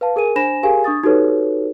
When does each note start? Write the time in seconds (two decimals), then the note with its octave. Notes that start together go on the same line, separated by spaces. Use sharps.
0.01 B4 F5 A5
0.16 G#4 A#4 G#5 D#7
0.36 D4 C5 G#5 B5 A#6 E7
0.63 G4 G#4 A#4 F5 G#5
0.84 D4 C#6 D#6 A6
1.03 D#4 F#4 G4 A4 B4 C#5